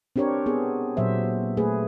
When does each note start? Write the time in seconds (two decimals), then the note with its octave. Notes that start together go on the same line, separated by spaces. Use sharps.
0.16 C4 D4 G4 A#4 C#5
0.46 B3 G#4
0.97 A#2 F#3 C5 E5
1.57 A3 G#4 B4